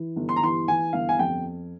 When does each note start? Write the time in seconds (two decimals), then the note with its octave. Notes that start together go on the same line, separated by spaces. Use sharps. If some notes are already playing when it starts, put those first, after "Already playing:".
Already playing: E3
0.16 G1
0.29 C6
0.36 A#5
0.42 E3 C6
0.68 E3 G#5
0.93 G1 F5
1.09 G#5
1.19 F2 G5